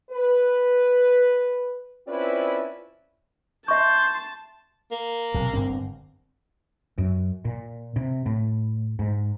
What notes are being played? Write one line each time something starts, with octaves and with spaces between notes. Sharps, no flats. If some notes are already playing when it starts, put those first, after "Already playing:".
B4
C4 C#4 E4 F4 B4 D5
E5 A5 C6 C#6 G6
A#3
B1 C3
G1 G2 C4
F#2
A#2
C3
A2
G#2